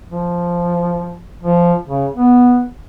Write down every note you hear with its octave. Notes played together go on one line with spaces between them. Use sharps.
F3
F3
C#3
B3